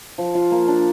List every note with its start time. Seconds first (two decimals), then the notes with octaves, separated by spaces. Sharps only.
0.18 F3
0.35 F4
0.51 A#3
0.68 D4